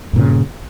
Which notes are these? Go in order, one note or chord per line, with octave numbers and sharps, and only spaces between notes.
G2 A#2 C#3